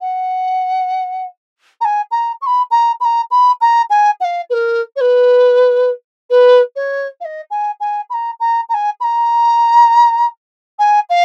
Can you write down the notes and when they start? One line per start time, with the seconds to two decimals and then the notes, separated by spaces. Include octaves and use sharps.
0.01 F#5
1.81 A#5
1.85 G#5
2.11 A#5
2.41 C#6
2.46 B5
2.71 A#5
3.00 B5
3.05 A#5
3.31 B5
3.61 A#5
3.90 G#5
4.20 F#5
4.24 F5
4.50 B4
4.53 A#4
4.96 C#5
5.01 B4
6.30 B4
6.76 C#5
7.20 F5
7.25 D#5
7.50 G#5
7.80 G#5
8.10 B5
8.13 A#5
8.40 A#5
8.69 A#5
8.74 G#5
9.00 B5
9.04 A#5
10.79 G#5
11.09 F5